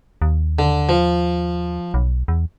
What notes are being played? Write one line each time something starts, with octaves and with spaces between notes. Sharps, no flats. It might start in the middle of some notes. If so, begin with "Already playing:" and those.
D#2
D3
F3
B1
E2